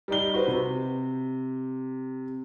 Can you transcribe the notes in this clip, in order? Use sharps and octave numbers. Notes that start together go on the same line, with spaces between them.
G3 D#4 G7
F#4 B4 C5
C3